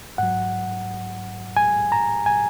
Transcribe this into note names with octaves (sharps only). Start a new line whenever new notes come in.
G#2 F#3 F#5
G#5
A#5
G#5